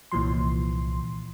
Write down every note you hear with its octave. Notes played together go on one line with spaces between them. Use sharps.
C2 A#2 E3 F3 C6